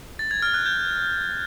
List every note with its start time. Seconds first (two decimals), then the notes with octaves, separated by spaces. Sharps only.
0.19 A6
0.31 G#6
0.42 F6
0.54 F#6
0.66 G6